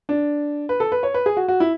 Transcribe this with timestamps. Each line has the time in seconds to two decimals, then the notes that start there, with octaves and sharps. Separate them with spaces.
0.09 D4
0.69 B4
0.80 A4
0.92 B4
1.03 C#5
1.14 B4
1.26 G#4
1.37 F#4
1.48 F#4
1.60 E4